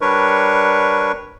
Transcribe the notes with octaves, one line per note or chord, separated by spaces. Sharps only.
G3 D4 A#4 B4 C#5 C#6